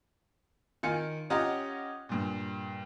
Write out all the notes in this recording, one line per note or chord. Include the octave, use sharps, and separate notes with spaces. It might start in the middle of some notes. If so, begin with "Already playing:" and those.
D#3 F4 G#5 C#7
C#4 F4 G4 D#5 F#5 A#5
G2 A#2